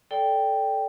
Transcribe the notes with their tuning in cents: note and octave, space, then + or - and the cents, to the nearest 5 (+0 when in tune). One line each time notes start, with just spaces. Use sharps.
A4 +0 D5 -15 G5 +0